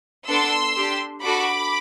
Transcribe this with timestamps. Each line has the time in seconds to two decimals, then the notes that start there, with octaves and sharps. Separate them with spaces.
0.28 B3 D4 A4 C6 E6
0.76 D4 G4
1.23 D4 F#4 A4 B5 D6